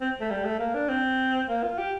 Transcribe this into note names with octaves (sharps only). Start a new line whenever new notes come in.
C4
A3
G3
A3
A#3
D4
C4
A#3
F4
G4